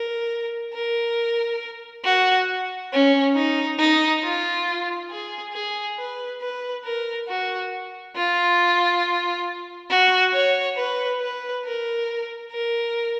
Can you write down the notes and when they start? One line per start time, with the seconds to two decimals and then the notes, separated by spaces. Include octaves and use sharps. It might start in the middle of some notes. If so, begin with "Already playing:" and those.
Already playing: A#4
0.74 A#4
2.04 F#4
2.92 C#4
3.36 D#4
3.79 D#4
4.23 F4
5.10 G#4
5.53 G#4
5.98 B4
6.41 B4
6.85 A#4
7.28 F#4
8.16 F4
9.90 F#4
10.33 C#5
10.77 B4
11.21 B4
11.65 A#4
12.52 A#4